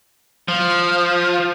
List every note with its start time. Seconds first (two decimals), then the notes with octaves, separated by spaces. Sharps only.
0.48 F3